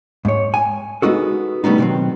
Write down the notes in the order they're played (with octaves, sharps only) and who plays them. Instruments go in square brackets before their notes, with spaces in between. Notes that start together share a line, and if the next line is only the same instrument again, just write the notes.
[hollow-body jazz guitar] G#2 C#5
G#5
G#3 B3 D#4 F#4 A4
C#3 G3 A3 B3 D#4
B2 D#3 F3 F#3 C4